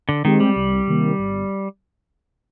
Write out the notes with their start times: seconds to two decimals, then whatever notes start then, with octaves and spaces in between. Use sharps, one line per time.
0.09 D3
0.25 D#3 G#3 C4 G4
0.40 G3
0.56 C2
0.87 C3 D#3 A#3
1.19 G1